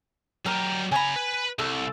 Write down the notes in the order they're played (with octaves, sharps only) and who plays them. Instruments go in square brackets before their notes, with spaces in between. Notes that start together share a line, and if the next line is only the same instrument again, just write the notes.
[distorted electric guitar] F#3 G4 [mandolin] A#4
[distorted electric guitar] C#3 A#5 [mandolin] G#5 B5
[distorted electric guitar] B4
[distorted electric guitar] C2 [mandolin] A4